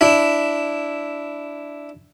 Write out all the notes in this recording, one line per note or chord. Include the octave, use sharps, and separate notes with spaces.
D4 E4